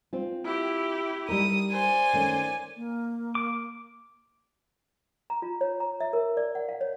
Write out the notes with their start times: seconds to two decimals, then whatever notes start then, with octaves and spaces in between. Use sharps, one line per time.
0.13 C4 F4
0.45 E4 G4
1.29 G3 D#4 A#4 D#6
1.72 C5 D5 G#5
2.13 D#3 A3 C#4
2.76 A#3
3.35 D6
5.30 A#5
5.42 F4
5.61 C#5
5.80 A#5
6.00 E5
6.13 A#4
6.37 D5
6.55 F#5
6.69 F5
6.81 C#5